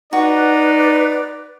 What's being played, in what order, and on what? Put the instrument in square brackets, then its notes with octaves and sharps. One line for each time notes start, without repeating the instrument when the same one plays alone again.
[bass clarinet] D#4 [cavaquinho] F#4 [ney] B4 [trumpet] D5